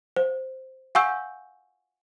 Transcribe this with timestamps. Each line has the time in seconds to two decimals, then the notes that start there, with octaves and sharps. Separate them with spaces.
0.16 C5
0.95 F5 F#5 G#5 C#6 E6 G6